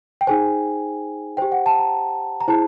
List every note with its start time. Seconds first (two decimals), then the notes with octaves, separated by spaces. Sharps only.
0.21 G5
0.27 D#4 G#4 C5 G#5
1.37 G4 C5 G5
1.52 F#5
1.66 A5
1.79 A#5
2.41 A#5
2.48 E4 G#4 C5 A5